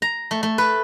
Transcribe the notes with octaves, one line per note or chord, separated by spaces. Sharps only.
A#5
A3
A3
B4